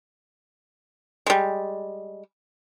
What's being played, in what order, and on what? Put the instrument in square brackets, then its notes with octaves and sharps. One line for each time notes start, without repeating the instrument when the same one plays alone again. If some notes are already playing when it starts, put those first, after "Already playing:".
[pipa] G3 G#3